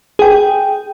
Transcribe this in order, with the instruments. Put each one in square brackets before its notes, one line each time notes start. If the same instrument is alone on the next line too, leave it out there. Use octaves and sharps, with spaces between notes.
[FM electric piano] G#4 G5